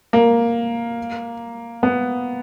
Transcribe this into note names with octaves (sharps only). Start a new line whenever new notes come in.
A#3
B3